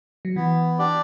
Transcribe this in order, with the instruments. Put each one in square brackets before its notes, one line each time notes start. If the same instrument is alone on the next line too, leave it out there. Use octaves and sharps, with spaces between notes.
[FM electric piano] F#3
[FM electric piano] E3 [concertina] B3
[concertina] D4 G4 D5